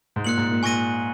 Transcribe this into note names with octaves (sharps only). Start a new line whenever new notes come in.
G#2
A#2 F#6 C#7 F#7
G#2
A#2
A#2 G#5 C#6 A#6 D#7